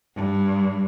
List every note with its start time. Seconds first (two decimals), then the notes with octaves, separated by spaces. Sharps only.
0.17 G2